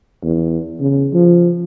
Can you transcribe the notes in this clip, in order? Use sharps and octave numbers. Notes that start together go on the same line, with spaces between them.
E2
C#3
F3